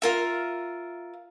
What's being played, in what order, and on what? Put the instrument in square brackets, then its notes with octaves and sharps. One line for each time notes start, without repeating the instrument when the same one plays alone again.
[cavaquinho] F4 A#4 E5